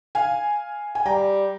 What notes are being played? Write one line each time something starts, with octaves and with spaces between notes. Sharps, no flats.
F5 G#5
G#5
G3 G5 A#5